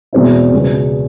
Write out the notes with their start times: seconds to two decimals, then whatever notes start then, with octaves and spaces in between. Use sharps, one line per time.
0.13 E2 B2 G#3 C4 E4
0.52 C#2 B2 G#3 B3